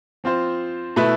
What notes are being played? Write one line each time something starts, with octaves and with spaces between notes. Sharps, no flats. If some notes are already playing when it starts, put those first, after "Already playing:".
F3 C4 F4 C5
B2 A3 E4 B4